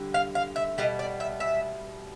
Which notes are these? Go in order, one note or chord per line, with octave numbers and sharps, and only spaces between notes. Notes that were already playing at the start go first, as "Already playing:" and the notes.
Already playing: D3 G3
F5
F5
E5
B2 G3 D#5
D5
E5
E5